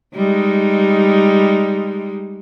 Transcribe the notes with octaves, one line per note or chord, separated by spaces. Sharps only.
G3 G#3 D#4